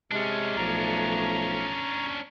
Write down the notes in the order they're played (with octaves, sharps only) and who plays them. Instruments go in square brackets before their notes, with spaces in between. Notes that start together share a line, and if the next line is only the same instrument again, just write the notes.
[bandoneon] C3 G#3 [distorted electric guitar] C#4 D4
[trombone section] B1 F3 A3 [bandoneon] A#5